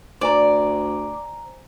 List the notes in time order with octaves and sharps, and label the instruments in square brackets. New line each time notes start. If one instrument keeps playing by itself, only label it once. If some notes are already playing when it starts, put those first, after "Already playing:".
[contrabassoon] D2 [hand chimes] C5 G#5 A#5 [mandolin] D5